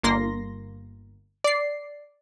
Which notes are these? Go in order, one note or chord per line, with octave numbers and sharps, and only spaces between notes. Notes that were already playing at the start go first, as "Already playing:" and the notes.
G1 A#3 C6 A#6
D5 C7